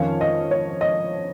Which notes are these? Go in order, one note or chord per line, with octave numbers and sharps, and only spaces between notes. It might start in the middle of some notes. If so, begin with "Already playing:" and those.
Already playing: F2 D#3 C#4 F4 C#5 F5
D#5
C#5
D#5